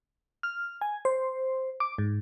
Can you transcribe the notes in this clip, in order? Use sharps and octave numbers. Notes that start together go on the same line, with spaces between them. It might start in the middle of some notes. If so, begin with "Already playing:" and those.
F6
G#5
C5
D6
G#2